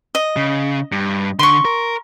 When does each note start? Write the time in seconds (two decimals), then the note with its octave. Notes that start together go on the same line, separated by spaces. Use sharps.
0.15 D#5
0.37 C#3
0.92 G2
1.39 D3 C6 C#6
1.65 A#4